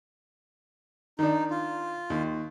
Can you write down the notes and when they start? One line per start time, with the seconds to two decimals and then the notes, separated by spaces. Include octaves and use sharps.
1.19 D#3 D4 D#4
1.51 F4
2.10 D#2